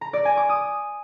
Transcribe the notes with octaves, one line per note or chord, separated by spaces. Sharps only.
A#5
D5
G#5
D6
D#6